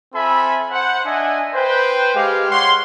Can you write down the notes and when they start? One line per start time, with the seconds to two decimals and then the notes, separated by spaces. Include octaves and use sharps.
0.13 C4 F4 A4 E5 G#5 B5
0.71 C5 F#5
1.05 D4 D#5 E5 G#5
1.55 B4 C5 G5
2.15 G#3 G4 F5
2.51 C#5 F5 F#5 C6